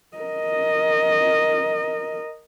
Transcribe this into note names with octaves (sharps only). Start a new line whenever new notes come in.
A#4 D#5